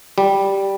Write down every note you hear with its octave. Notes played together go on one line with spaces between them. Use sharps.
G3